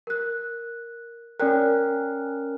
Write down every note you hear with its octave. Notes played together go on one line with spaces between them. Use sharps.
A#4 F#6
C#4 A#4 D5 G5 F#6